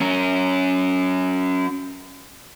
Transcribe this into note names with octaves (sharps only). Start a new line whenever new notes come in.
F#3 C#4